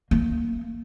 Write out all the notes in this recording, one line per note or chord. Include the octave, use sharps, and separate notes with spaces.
A#3